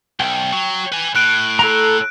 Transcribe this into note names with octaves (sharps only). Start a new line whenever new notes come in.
B1 G5
F#3
B4 G#5
A2 F#6 D7
A4 A#5